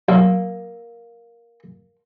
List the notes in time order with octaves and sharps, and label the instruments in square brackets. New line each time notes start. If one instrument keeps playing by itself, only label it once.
[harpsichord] B1 [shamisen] A#3